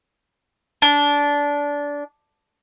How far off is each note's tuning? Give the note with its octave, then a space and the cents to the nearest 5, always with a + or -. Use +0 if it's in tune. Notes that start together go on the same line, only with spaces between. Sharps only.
D4 -20